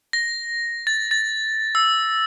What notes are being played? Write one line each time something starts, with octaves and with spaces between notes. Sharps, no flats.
A#6
A6
A6
E6